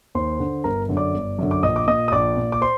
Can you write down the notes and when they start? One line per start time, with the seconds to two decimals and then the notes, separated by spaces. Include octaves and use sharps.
0.15 D#2 C5 C6
0.40 D3
0.64 G1 A#4 A#5
0.89 F#2 D3
0.97 D5 D6
1.14 G1
1.38 F#2 D3
1.51 D6
1.63 A#1 D#5 D#6
1.76 D6
1.87 A#2 D#5 D#6
2.08 D#6
2.12 A#1 D5 D6
2.37 A#2
2.52 D6
2.61 C5 C6